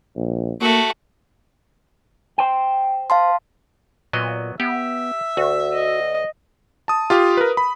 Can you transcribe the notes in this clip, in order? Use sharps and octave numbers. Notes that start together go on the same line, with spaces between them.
A#1
A3 A#3 F#4
C5 G5
F5 A5 C6
A#2 F#3 B3 D#5
B3 G4 E5
D2 F#4
D#5
A5 D#6
F4 G4 F5
A#4 B4
B5